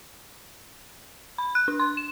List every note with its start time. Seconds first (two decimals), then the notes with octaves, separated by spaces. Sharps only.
1.38 B5
1.55 F#6
1.68 D4
1.79 C6
1.97 E7